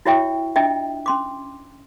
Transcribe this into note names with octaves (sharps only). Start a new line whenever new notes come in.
E4 F#4 C#5 E5 G5 C#6
D4 F4 D#5 E5 G5
C#4 C6 D6